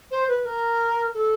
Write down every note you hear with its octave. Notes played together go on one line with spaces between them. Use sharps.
C5
B4
A#4
A4